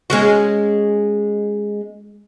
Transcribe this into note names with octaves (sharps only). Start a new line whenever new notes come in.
G#3 C#4 F#4